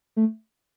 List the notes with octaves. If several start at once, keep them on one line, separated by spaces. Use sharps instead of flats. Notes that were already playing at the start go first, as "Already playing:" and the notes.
A3